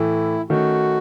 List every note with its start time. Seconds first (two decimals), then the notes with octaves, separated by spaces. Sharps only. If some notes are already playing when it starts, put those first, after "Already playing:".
Already playing: A2 E3 A3 E4
0.50 D#3 A3 C#4 F#4